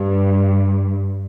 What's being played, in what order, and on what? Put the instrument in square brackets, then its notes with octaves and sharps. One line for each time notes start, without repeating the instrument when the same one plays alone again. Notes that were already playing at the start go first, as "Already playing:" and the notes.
Already playing: [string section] G2